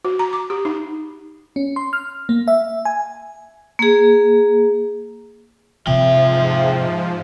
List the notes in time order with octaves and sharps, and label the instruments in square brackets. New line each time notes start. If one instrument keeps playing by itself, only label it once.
[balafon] F#4
A#5
D6
G4
D#4
[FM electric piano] C#4
C6
F6
A#3
E5
G#5
[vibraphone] A#3 G#4
[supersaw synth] G#2 F3 [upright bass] C3 [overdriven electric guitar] F4 G5 [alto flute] E5